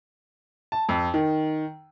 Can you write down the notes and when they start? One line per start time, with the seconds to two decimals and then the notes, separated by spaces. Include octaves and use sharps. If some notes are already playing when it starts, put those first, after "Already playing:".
0.72 A5
0.89 F2
1.14 D#3